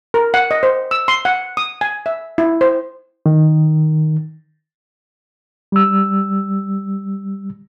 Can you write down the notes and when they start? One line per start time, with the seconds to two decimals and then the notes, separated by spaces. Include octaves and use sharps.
0.14 A#4
0.34 F#5
0.51 D#5
0.63 C5
0.91 E6
1.08 C6
1.25 F#5
1.57 D#6
1.81 G#5
2.06 E5
2.38 E4
2.61 C5
3.26 D#3
5.72 G3 E6